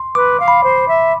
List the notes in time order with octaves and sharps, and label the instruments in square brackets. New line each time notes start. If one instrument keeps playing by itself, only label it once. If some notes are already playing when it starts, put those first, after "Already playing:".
Already playing: [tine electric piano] C6
[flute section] B4 [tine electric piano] D6
[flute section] F5
[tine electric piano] B5
[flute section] C5
E5